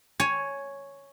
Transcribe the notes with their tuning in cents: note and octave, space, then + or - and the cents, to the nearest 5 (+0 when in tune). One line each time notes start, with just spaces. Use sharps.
C#5 +0 G#5 +15